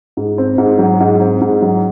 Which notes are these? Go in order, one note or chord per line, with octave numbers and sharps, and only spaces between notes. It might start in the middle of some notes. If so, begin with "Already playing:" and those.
G#2
C4
G#2
F#3
G#2
C4
G#2
F#3